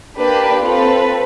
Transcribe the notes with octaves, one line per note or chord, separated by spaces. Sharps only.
A#3 D4 G4 B4
C4 F4 A4 B4